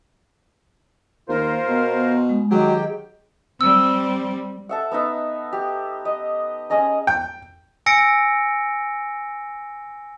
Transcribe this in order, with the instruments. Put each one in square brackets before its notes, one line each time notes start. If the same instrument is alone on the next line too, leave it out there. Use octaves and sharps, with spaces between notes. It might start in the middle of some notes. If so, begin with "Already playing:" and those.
[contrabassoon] D#2 [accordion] F4 A#4 C5
[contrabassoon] B2 [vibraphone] B3
[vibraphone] G#3
[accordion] D#3 G4 G5 [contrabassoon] F#3 [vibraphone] G#4 D#5
[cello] G3 C4 [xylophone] E6
[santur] A4 E5 F#5
B3 D#4 E5 E6
G4
D#5
C#4 G#4 D#5 A#5
[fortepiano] G5
[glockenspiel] G#5 E6 A#6 C#7 D7